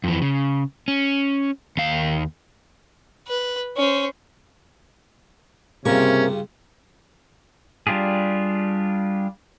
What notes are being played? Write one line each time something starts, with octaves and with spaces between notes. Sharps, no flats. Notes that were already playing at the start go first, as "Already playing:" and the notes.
F2 E3
C#3
C#4
D#2 F5
B4
C#4 C5
C#2 G2 C3 A#3 C#4 A#4 C#6
G3 D4 F4 G4 G#4